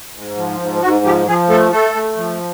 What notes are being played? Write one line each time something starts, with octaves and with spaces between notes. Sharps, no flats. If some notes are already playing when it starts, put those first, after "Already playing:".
G#2
F3
G#2
G#2 F#4
F3 G4
F3 G#4
A3 A4
A3 A4
A3
F3